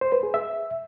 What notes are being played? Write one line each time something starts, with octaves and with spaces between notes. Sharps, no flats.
C5
B4
G#4
E5